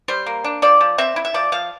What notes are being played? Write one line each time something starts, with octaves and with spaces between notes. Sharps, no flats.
G3 C5
A#3
D4
F3 D5
F3
C4 E5
E4
E5
F3 D5
F3 F5